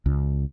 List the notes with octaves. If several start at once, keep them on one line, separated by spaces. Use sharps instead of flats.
C#2